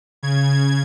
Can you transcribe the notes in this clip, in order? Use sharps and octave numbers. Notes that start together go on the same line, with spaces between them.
C#3 G#6